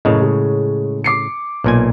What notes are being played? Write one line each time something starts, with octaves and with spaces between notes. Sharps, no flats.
F#1 A2 C#3 D#5
G#3
D6 C7 C#7
B1 A#2 G#5